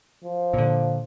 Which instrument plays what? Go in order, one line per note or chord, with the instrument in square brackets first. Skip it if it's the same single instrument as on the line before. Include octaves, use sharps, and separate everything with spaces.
[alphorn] F3
[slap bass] A#2 D3